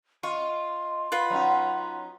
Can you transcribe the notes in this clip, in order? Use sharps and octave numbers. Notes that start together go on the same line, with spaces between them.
F4 D#5 C6 C#6
F4 B4 F#5
F#3 C#4 D#4 A#5